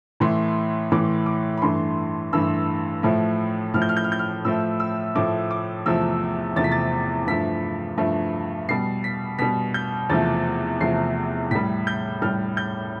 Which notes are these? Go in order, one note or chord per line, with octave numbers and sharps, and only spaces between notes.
A2 E3 A3 C6
A2 E3 A3 D6
D6
B5
G2 E3 A3 C6
G2 E3 A3 E6
A2 F3 A3
A2 F3 A3 F6
G6
F6
G6
F6
G6
F6
A2 F3 A3 E6
E6
A2 F3 A3 D6
D6
E2 C3 F3 A3 E6
E2 C3 F3 A3 A6
B6
A6
G2 F3 A3 B6
G2 F3 A3
B2 G3 C7
B6
B2 G3 B6
G6
E2 C3 F3 A3 A6
E2 C3 F3 A3 C7
A2 G3 B6
G6
A2 G3 F6
G6